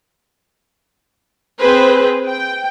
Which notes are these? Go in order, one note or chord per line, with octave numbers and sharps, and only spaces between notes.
C4 G#4 B4 C5
G5